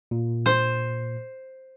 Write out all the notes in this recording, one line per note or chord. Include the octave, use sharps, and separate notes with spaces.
A#2
C5